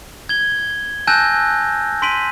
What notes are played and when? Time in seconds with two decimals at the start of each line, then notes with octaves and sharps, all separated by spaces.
0.29 G#6 G7
1.07 G#5 A5 E6 F#6 G6 A#6
2.02 C6 B6 D7 D#7 F#7